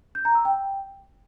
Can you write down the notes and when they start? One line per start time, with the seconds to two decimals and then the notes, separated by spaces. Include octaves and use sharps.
0.15 G6
0.25 A#5
0.35 E6
0.45 G5